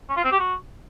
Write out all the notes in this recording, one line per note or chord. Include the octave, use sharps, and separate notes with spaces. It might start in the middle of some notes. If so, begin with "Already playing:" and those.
C#4
F4
C4
G4
F#4